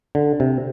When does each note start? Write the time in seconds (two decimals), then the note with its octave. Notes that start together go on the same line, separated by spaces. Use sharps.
0.15 D3
0.40 C3